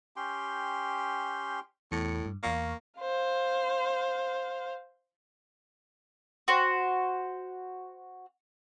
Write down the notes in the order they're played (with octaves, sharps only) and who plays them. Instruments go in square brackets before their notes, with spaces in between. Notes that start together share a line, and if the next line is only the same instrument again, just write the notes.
[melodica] C#4 G4 G5 C6
[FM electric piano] E2 C#7 [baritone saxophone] A2
[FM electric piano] G2
[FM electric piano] E2 F5 C#6 [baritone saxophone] A#3
[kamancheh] C5 F5
[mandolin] F#4 C5